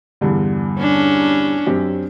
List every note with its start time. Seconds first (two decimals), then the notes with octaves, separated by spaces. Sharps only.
0.21 E2 G2 D3
0.79 C#4 D4
1.66 F#2 C4 G4